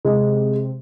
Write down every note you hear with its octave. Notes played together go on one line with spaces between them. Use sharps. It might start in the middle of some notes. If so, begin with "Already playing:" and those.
C3 G#3